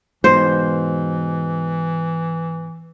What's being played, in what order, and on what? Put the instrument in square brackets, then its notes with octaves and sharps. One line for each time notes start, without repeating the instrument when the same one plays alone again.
[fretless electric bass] G#2 B2 [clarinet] E3 [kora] C5